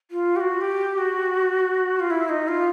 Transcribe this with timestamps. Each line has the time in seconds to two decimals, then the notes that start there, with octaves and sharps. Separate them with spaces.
0.11 F4
0.36 G4
0.41 F#4
0.61 G4
0.98 F#4
2.00 F4
2.11 E4
2.29 D#4
2.48 F4